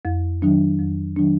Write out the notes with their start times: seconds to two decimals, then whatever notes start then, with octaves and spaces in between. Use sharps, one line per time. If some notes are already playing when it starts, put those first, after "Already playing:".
0.05 F2
0.42 D#3 F#3 D4
0.79 F2
1.16 D#3 F#3 D4